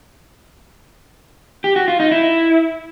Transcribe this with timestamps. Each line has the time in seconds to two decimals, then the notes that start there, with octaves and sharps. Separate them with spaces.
1.64 G4
1.76 F#4
1.88 F4
2.00 D#4
2.11 E4